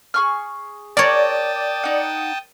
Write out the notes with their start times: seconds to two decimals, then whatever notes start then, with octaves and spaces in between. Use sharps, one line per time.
0.14 G#4 C#6 F6
0.97 A#4 C#5 D5 G5 A5 D#6
1.84 D#4 F#5